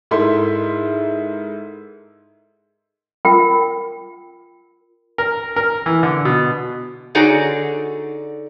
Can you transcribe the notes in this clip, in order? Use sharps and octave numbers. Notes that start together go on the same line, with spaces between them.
G#2 E4 A4 A#4 E5 C6
F4 A#4 G5
A#4
A#4
E3
D3
B2
D3 D#4 F#4 G#4 C#5 D5